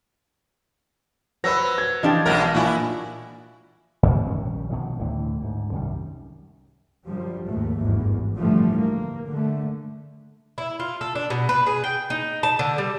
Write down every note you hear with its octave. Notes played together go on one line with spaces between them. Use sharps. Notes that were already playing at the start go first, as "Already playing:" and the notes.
F#3 B4 C5 E6 A#6
G#6
E3 F3 D4 G4 D#5
B1 B2 G#3 A#4
A#2 E4 F#4 G#5
G#2 C#3 E3 F3
A#1 D#3 G3 C#4
B2 D#3 F3 F#3
D2 A2 D3 E3
D2 G#2
C2 F#2 D#3 G3
F#2 D3 F3 G3
D#2 G#2 A3
G#1 E2 G2
A2 D3 E3 F3 G3 A3
A#3
D3 A3
E4
F4
A4
D4
B2
B4
G#4
G5
D#4
A5
D3
G3